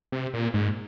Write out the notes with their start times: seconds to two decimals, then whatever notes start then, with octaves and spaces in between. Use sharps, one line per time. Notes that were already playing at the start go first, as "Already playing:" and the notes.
0.12 C3
0.34 A#2
0.54 G#2